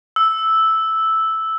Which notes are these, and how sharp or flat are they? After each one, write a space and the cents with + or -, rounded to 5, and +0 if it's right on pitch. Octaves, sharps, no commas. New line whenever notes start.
E6 -5